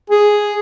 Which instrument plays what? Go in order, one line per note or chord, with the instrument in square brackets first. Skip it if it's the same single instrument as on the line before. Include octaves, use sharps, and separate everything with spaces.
[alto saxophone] G#4